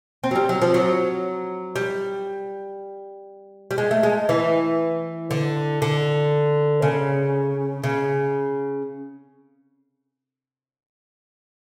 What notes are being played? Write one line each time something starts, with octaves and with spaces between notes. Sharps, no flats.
C4
F#3
G3
F#3
F3
F#3
G3
G3
G#3
A3
G#3
E3
D3
D3
C#3
C#3